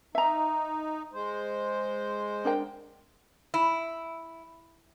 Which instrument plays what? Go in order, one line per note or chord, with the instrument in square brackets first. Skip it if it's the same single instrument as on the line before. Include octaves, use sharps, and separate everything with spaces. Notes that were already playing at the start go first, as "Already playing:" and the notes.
[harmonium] D#4 [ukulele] E5 A#5
[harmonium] G#3 C5
[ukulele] D4 A#4 G5
[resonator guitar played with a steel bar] E4